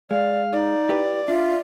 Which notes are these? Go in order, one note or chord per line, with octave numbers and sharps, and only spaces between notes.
G#3 D5 F5
D#4 D5
E4 G4 B4
D4 F4 E5